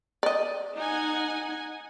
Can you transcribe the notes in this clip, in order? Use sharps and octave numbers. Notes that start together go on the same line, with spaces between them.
D5 D#5
D#4 F#5 G#5